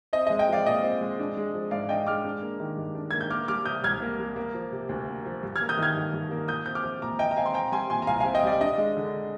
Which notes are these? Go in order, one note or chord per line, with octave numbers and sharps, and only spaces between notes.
C4 D#5
G#3 D#5
D#5 G5
F3 D5 F5
A#2 D#5
C4
G#3
D4
G#3
F3
G#2 D5 F5
D4 D#5 G5
G#3 D6 F6
D4
A#3
D#3
G2
D4
A#3 G#6
G6
A#3 D6 F6
G3 D6 F6
C3 D#6 G6
C2 F6 G#6
A#3
G3
A#3
F3
C3
D2
A#3
F3
G2
F6 G#6
A#3
D#6 G6
D#3
F6 G#6
G2
G2
A#3
A#2 D#6 G6
C4 G6
D6 F6
F3
A#2 A#5 D6
A#2 D#5 G5
A#5
C4 F5 G#5
C6
C4 G5 A#5
G3 G#5 C6
A#2 G#5 C6
A#5
C2 F5 G#5
C4 F5 G#5
D#5 G5
G3 D5 F5
D4 D#5
G#3
D3